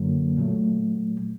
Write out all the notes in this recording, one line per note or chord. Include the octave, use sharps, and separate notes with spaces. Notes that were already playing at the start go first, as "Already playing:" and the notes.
Already playing: F#2 D3 F#3 A#3
A#2 F#3 A3